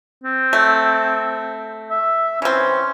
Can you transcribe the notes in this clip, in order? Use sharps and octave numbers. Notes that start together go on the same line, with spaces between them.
C4
A3
E5
E3 C4 C#4